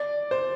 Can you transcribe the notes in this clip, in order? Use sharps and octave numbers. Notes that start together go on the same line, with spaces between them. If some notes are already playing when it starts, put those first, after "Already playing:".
Already playing: D5
C5